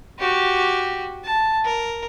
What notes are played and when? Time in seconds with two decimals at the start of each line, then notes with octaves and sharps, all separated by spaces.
0.19 F#4 G4
1.25 A5
1.65 A#4